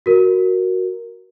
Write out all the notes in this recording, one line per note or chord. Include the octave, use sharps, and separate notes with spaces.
F#4 A#4